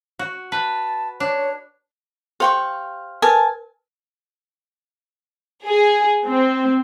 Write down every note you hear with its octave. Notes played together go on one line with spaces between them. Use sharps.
F#4
B4 A5
D4 C#5
G4 C5 F5 G5 C6 C#6
A#4 B4 G#5 A5
G#4
C4